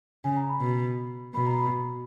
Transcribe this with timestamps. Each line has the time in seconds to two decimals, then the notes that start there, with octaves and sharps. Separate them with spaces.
0.24 C#3 G#5
0.37 A#5
0.49 B5
0.61 B2
1.34 B2 B5
1.46 A#5
1.58 B5